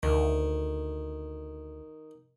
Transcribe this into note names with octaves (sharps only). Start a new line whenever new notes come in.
D2 D#3